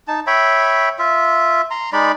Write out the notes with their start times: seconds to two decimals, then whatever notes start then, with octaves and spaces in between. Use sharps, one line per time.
0.08 D#4 A5
0.27 C#5 E5 G5 B5
0.99 F4 E5
1.71 A#5 C6
1.93 G#3 D#4 D5 B5